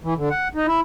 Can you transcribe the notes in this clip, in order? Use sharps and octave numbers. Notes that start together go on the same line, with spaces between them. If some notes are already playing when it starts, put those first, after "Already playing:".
E3
D3
F#5
D#4
E4